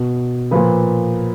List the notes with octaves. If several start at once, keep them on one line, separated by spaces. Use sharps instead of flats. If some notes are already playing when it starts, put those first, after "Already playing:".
Already playing: B2
A#2 F3 B4